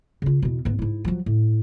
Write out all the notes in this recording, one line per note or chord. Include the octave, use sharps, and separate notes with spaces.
C#3 F4
E2 B2
G#2 B3
G#2 E4
F3 F#3
A2